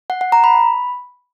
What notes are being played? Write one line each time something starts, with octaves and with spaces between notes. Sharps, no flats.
F#5
F#5
A#5
B5